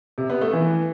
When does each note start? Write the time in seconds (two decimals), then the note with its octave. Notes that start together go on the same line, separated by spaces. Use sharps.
0.18 C3
0.30 B3
0.41 A3
0.53 E3